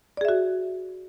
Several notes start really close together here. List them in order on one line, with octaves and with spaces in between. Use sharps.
D5 G#4 E5 F#4